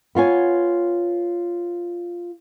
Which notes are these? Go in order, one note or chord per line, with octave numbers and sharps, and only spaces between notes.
B3 F4 C#5 G#5